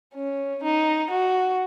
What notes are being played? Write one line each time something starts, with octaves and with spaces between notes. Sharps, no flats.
C#4
D#4
F#4